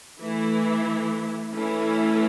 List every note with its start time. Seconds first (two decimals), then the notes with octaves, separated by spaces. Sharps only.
0.21 E3 A3 E4
1.53 E3 A3 C#4 E4